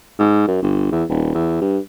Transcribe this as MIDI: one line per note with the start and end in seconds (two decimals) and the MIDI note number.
0.19 0.46 44
0.47 0.58 42
0.62 0.89 31
0.92 1.04 40
1.09 1.30 27
1.34 1.60 40
1.61 1.78 43